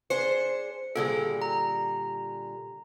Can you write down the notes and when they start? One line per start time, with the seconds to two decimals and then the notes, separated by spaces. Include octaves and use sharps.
0.10 D4 G#4 C5 C#7
0.96 A#2 D3 G3 G#4 A4
1.42 A#5